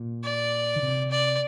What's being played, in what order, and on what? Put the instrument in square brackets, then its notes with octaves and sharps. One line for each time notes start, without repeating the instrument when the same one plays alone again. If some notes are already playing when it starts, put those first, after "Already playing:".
Already playing: [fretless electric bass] A#2
[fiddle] D5
[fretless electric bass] D3
C3
[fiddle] D5